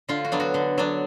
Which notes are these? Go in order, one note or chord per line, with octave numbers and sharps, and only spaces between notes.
D3 F4
F#4
F#3 B3 D4
F#4
D3
F#3 B3 D4